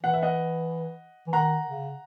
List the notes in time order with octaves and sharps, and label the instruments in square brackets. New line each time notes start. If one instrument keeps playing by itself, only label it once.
[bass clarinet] E3 [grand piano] F#5
[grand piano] E5
D#5 F#5
[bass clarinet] E3
[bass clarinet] D#3 [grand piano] F#5 A#5
[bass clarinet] C#3